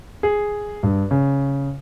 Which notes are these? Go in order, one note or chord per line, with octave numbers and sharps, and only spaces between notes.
G#4
G2
C#3